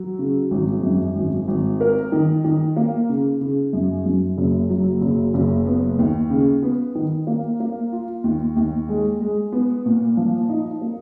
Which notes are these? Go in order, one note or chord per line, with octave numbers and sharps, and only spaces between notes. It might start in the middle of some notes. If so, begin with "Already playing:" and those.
Already playing: F#3
C#3
G#1
F#2
G#1
G#1
A#4
D#3
D#3
A#3
C#3
C#3
F#2
F#2
F#1
F#3
F#1
F#1
B3
D#2
C#3
B3
D#3
A#3
A#3
F4
D#2
D#2
G#3
G#3
B3
A#2
F3
D#4
A#3